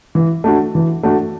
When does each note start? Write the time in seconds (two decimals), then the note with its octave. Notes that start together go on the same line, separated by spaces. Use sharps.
0.15 E3
0.44 A3 D4 F#4
0.75 E3
1.03 A3 D4 F#4